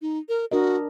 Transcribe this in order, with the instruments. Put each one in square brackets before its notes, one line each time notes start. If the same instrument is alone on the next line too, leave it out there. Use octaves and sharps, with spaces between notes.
[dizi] D#4
A#4
[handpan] D4 A#4 D#5 [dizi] F#4